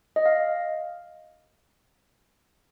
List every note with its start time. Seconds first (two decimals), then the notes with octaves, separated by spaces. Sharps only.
0.16 D#5
0.26 F5